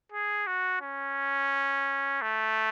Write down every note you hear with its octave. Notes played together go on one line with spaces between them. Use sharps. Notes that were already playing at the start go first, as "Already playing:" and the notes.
G#4
F#4
C#4
A3